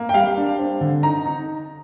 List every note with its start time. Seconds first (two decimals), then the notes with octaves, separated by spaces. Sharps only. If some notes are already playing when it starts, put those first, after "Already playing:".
Already playing: A#3
0.09 G5
0.14 G3 F5
0.37 D4
0.59 C4
0.81 D3
1.03 D#4 A#5
1.26 D#4